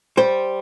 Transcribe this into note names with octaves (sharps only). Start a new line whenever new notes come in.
G3 C5